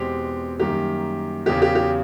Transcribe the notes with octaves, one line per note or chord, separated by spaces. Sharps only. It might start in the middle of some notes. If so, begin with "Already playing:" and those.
Already playing: E2 B2 G#3 C4 G4
F#2 D#3 G3 A#3 G4
E2 C#3 F#3 G4
G4
G4